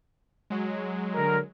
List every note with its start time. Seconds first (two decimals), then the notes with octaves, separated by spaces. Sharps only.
0.50 F#3 G#3
1.14 D3 A#4